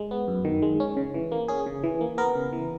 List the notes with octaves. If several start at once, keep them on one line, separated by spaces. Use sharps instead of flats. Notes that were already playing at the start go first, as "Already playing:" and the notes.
Already playing: G#3
B3
F#2
D#3
G#3
C#4
C#3
E3
A#3
C#4 G#4
C#3
E3
A#3
B3 A#4
C#3
E3